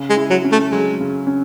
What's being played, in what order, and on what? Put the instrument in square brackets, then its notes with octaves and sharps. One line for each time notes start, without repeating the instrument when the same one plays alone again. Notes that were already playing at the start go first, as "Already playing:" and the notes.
Already playing: [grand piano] C#3
[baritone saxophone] G#3
[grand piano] E4
[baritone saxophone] F#3
[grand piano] C#4
[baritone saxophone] A3
[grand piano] F#3 [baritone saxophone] G#3
[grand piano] C#3
C#4